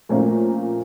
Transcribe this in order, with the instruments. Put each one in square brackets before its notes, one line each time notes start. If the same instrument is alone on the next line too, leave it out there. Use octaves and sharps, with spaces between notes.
[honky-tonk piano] A#2 F3 A3 A#3 C4 C#4